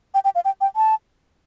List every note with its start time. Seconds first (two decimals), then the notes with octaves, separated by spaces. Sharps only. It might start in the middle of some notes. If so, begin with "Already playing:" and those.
0.14 G5
0.24 G5
0.35 F5
0.45 G5
0.61 G5
0.76 A5